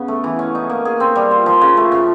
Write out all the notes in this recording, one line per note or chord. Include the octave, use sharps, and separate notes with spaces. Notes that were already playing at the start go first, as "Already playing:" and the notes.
Already playing: C#3 B3
A3
E3
C#4
D#4
A#3
G#4
C4
G3
F4
F3
C#3
A3
C#3